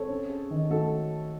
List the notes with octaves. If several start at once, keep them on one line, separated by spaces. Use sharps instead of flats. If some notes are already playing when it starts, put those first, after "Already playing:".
Already playing: C4 A4 C#5
C#4
G#4
D#3
A3 F#4 A4